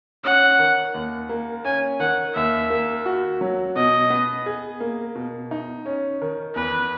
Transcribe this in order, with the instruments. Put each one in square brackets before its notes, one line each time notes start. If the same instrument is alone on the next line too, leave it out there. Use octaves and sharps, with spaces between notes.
[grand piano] C#4 [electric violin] F#5
[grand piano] D#3
D#2
A#3
[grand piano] C#4 [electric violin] G#5
[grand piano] D#3 [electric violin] F#5
[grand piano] D#2 [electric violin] E5
[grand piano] A#3
F#4
F#3
[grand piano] B2 [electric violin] D#5
[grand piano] B3
G#4
A#3
B2
D#4
C#4
D#3
[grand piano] E2 [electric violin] B4